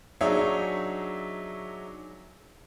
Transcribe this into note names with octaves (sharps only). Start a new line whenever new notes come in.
F#3 D4 D#4 G#4 C#5 E5